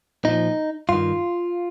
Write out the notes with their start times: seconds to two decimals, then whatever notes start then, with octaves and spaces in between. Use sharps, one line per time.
0.25 A#2 F3 D#4
0.89 G2 D#3 F4